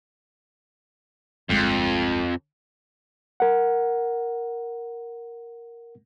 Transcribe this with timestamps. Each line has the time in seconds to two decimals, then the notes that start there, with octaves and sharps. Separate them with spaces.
1.49 D1 G1 F2 G#3
3.40 A#4 F#5